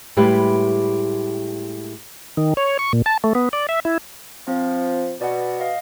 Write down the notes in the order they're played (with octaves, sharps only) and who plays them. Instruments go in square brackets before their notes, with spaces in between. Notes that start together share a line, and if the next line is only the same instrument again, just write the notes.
[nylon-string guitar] A2 G3 G#3 G4 B4 E5
[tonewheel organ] D#3
C#5
C#6
A#2
A5
A3
B3
D5
E5
E4
[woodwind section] F3 [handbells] C4
[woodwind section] B2 [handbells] D5 F#5
[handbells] D#5 F5